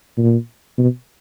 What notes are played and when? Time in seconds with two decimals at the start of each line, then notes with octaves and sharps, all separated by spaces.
0.17 A#2
0.78 B2